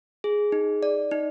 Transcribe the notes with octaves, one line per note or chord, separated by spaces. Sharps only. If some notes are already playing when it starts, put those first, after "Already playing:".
G#4
D#4
D5
D#4